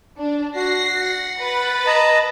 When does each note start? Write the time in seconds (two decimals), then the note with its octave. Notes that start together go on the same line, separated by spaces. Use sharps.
0.18 D4
0.56 F#4 A#6 C7
1.01 F#5
1.38 B4 B5 A6
1.87 D#5 A5 A#5